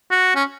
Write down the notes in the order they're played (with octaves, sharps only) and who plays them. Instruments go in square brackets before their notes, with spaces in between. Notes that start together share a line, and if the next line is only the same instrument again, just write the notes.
[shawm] F#4
C#4